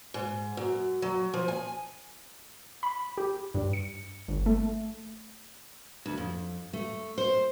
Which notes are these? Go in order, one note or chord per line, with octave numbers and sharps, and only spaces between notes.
G#2
F#2
F#3
F3
G#5
B5
G4
G2
C#7
G1
A3
D2
F2
A3
C5